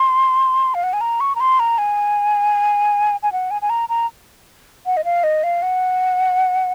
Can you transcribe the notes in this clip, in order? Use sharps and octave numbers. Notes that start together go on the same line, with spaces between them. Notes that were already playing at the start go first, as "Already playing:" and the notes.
Already playing: C6
F5
F#5
G#5
A#5
C#6
A#5
C6
A#5
G#5
G#5
F#5
G#5
G#5
A#5
A#5
F#5
D#5
F5
D#5
F5
F#5